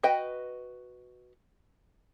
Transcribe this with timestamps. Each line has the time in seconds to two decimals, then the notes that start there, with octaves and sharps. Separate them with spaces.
0.03 F#4 B4 D#5 G5